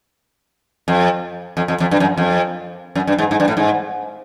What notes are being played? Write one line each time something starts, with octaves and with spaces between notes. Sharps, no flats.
F2
F2
F2
F2
G2
F#2
F2
F#2
G2
G#2
G#2
G2
A2
G#2